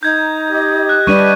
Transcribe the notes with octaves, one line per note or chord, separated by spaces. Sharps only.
D#4 A#5 G6 G#6
G4 D#5
F#6
G3 D4 B4 D5 C#6 D#7